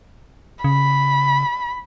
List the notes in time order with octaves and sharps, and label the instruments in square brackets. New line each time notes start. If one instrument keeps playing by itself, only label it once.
[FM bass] C#3 [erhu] B5